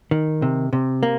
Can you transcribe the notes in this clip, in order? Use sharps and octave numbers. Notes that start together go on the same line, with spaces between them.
D#3
C3
C3
A#3